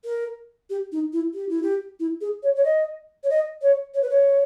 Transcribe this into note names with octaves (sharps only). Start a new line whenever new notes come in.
A#4
G4
D#4
E4
G4
E4
G4
E4
G#4
C#5
C#5
D#5
C#5
D#5
C#5
C#5
B4
C#5